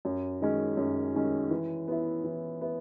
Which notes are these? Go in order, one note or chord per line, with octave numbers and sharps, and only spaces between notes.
F#2
D#3 G#3 C#4
F#2
D#3 G#3 C#4
E3
B3 E4
E3
B3 E4